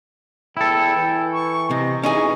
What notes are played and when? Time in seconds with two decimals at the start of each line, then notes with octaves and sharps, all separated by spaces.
0.57 E2 E4 A4 G5
0.96 E3
1.33 C#6
1.71 C3 D#5
2.03 E3 C#4 D#4 G#4 C#6